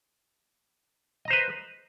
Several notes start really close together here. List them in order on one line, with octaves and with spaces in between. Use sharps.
D#5 A#5 C5 B4